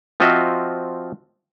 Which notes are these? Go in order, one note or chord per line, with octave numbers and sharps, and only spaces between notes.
F3 C4 F4 F#4 D#5 E5